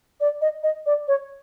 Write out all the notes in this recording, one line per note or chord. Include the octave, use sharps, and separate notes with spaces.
D5
D#5
D#5
D5
C#5